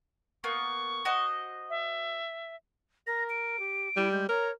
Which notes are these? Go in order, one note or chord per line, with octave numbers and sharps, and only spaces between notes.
A#3 B3 C#6
F#4 C5 D#5
E5
A#4 A#6
D7
G4
G3 E4
G#3 G6
A#4 C#5 A#5